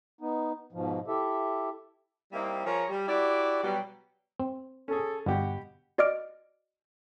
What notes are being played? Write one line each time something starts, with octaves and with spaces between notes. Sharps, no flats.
B3 D#4
G#2 B2 F3
E4 G4 A4 E5
G3 A#3 C4 D#4 E4
F3 G#4 A#4 C#5
G3
E4 F#4 G4 D5
B2 F#3 G3
C4
C#4 G#4 A4
G1 B2 G4 F#5 G5
F#4 D5 D#5 D6 F6 D7